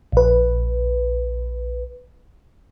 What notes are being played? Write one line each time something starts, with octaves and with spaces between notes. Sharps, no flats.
A#1 B4